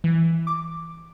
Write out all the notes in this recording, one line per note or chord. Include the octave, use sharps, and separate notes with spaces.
E3
D6